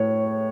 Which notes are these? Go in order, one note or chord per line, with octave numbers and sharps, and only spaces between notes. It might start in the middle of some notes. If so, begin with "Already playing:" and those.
Already playing: A2 C#5